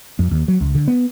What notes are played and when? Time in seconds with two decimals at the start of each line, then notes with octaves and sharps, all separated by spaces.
0.19 F2
0.31 D#2
0.48 F#3
0.61 C#2
0.75 D3
0.88 B3